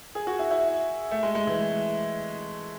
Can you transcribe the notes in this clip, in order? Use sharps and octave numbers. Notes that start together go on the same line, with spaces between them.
G#4
F#4
E4
E4
A3
G#3
G#3
E3